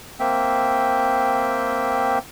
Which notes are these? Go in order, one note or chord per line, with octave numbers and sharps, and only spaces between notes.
A#3 C4 E5 G5